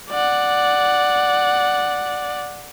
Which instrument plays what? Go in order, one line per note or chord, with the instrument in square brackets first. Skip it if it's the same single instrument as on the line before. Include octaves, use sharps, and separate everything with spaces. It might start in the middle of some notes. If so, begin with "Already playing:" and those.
[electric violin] D5 F#5